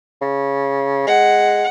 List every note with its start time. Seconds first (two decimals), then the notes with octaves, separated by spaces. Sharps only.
0.21 C#3
1.07 G#3 F#5